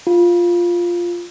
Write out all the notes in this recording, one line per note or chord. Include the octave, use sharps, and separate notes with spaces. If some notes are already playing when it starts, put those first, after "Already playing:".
F4